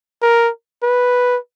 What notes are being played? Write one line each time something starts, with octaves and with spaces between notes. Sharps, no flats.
A#4
B4